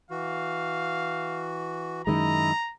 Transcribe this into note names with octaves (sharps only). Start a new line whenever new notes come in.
E3 F#4 F5
F#2 D#3 G#3 E4 D#5 A#5